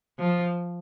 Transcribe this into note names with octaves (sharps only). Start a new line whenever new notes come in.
F3